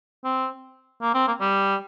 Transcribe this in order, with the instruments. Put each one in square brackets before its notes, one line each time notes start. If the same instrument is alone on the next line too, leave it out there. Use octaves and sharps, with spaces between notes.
[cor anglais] C4
A#3
C4
A#3
G3